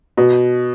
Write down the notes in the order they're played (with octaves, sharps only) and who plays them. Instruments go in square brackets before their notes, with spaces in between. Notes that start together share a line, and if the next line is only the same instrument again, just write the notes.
[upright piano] B2